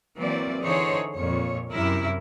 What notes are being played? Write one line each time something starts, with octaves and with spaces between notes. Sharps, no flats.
E3 F#3 A#3 C4 D5
D3 E3 D#4 G#4 C5 C#5
F2 A#2 C#5
F#2 C3 E4 A#4